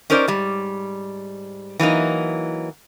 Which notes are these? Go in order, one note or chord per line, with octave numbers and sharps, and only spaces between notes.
C#4 D#4 A#4 C5 D5
G#2 G3
E3 F#3 A#3 D#4